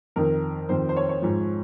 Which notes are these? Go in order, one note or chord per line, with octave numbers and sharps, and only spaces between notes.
F2 D#3 A#4
F2 D#3 C5
C5
C#5
C#5
G#2 F3